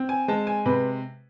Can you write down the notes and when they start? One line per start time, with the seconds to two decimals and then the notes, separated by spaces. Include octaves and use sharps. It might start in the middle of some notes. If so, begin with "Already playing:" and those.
Already playing: C4
0.09 G#5
0.28 G#3 A5
0.47 G#5
0.66 C3 B4